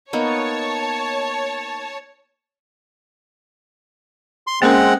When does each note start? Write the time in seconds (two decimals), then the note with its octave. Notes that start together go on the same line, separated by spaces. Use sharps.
0.13 A#3 B3 D#4 C#5 A5
4.47 C6
4.62 G#3 A#3 C4 C#4 A#4 F#5